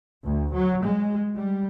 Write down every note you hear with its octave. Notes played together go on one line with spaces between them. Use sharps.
D2
F#3
G#3
G3